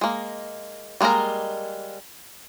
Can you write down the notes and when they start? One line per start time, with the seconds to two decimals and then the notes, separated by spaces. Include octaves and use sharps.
0.01 G#3 A#3
1.01 G3 G#3 A#3 A#4 A#5